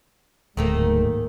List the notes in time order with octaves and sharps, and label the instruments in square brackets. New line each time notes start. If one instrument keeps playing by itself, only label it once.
[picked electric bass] D1 [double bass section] G#2 [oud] D#3 A3 A#3